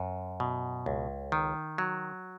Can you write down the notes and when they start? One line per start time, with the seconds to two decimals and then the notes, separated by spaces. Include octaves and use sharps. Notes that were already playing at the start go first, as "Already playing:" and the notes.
Already playing: F#2
0.40 B2
0.86 C#2
1.32 D#3
1.78 F#3